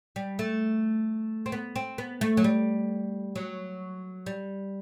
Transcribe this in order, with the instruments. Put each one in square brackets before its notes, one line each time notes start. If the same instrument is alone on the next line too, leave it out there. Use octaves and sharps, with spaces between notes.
[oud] G3
A3
C4
B3
C4
B3
A3
F#3
G3
F#3
G3